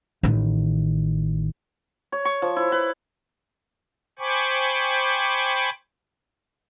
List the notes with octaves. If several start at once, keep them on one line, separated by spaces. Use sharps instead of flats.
A1 D#3
C#5
C#6
F3
E4
B4
C5 G5 G#5 B5 C#6 D6